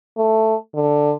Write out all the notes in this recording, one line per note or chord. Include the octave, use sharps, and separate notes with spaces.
A3
D3